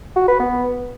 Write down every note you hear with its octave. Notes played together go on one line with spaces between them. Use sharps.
F#4
B4
B3